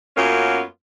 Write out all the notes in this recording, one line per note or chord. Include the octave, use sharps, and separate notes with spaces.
F#2 A#3 B3 C#4 F4